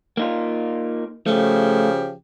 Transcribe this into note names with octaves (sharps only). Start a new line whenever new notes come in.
A#3 D#4 F4
C#3 F3 A3 G4